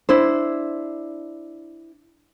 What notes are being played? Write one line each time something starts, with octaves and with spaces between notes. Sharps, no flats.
D4 E4 C5